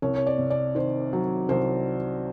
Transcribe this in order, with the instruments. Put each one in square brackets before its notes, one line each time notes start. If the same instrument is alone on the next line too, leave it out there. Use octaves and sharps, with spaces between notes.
[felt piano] C2 C#5
C#5
D5
C3
D5
D#3 C5
F#3
C2 C5